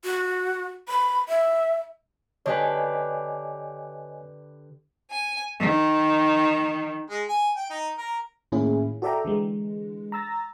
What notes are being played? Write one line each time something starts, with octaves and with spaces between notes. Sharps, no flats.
F#4
B5
E5
D3 G4 B4 C#5 D#5 G#5
G#5
D#3
G#3
G#5
G5
D#4
A#4
A2 D#3 A#3 C#4 E4 G#4
F#4 A4 D5 E5 G5 A#5
D3 E3 G#3
A#5 E6 A6 A#6